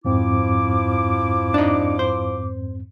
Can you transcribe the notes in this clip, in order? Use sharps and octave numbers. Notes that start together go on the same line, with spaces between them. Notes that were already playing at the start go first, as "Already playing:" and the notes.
F2 G#2 F3 C4 E4 D6
D4 D#4
C5